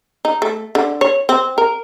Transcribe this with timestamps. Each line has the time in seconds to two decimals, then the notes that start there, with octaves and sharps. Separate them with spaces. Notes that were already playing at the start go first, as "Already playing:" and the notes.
0.25 D#4
0.42 A3
0.75 D3
1.01 C#5
1.29 C4
1.58 A#4